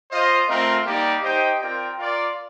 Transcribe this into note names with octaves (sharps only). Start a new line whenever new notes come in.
F4 C5 D#5
A3 C4 F4 A#4
G3 A#3 D#4 G4 D5
D#4 G4 C5 D#5 G5
C4 F4 A#4 D5 G5
F4 A#4 D5